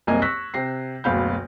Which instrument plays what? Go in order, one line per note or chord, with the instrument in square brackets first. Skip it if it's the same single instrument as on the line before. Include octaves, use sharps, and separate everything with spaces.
[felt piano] F#1 C2 A#3 D#5 G#5 G#6
C#6 E6 F#6 A#6 B6
C3 G5 A#6 C7
F#1 D2 B2 F5 B5 G6